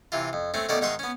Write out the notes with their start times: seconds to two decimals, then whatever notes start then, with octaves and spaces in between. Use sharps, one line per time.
0.12 C3 E3 F4
0.33 F2
0.54 A3 C4 C#4
0.69 B2 D#3 A3 C#4 A4 D5
0.81 G#2 D#3 D#4 E5 C6 C#6
0.99 B3 C#4